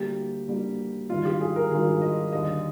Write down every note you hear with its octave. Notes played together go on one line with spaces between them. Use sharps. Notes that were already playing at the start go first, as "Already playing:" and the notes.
Already playing: D2 D3 G3 A#3 G4
D2 D3 G3 A#3
G#1 G2 D#3 F4
G4
G#4
A#4
G#1 G2 D#3 G#4
D#5
D#2 D3 G3 D#5